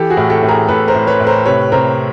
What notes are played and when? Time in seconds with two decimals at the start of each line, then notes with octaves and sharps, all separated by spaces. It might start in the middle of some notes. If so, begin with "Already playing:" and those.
Already playing: E3 G4 A4
0.10 F#4 G#4
0.17 A2
0.30 G4 A4
0.43 A2
0.49 G#4 A#4
0.68 A2 A4 B4
0.88 A#4 C5
0.94 A2
1.07 B4 C#5
1.20 A2
1.27 A#4 C5
1.45 C3 B4 C#5
1.72 C3 A#4 C5